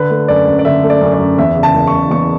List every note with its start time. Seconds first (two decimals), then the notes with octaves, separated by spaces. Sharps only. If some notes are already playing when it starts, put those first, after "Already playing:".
Already playing: D3 B4
0.10 A3
0.28 F#2 D5
0.48 F#2
0.59 D5
0.65 D3 E5
0.83 A3
0.90 D5
1.01 F#2
1.14 D5
1.19 F#2
1.38 E2 E5
1.56 C#3
1.63 A5
1.74 F#1
1.87 C#6
1.93 F#1
2.11 E2 C#6